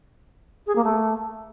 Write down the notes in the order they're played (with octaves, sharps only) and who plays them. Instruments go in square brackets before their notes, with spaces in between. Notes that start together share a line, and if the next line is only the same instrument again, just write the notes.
[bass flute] G#4
A#3
A3